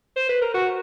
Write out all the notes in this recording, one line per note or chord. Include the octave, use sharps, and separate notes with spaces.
C5
B4
A#4
F#4